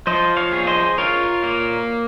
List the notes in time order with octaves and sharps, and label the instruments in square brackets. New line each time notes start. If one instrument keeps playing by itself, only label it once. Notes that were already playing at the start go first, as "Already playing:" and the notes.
[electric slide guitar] F3 [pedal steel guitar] C5 D#5
[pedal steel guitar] C#5 F5
[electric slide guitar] G#4
[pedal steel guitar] C5 D#5
[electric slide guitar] F4 [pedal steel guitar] A#4 C#5
[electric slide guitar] A#3